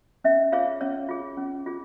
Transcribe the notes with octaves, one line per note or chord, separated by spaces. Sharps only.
C#4 E5
F4 G#4 C#5 F5
C#4 C#5
F4 G#4
C#4
F4 G#4